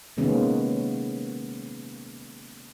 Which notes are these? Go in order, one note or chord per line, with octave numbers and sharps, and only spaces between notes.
C3 D#3 G#3 A#3 B3 C#4